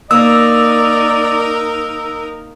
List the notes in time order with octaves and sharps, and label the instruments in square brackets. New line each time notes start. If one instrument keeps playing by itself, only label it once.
[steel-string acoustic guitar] A#3 [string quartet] D#4 A#4 [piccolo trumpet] D5 [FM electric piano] E6